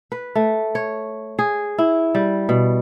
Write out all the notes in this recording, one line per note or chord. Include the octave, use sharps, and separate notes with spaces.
B4
A3
C#5
G#4
E4
G3
B2